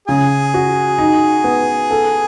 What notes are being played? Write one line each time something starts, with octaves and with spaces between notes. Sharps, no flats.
C#3 G#4
F#4
D#4
B3
A4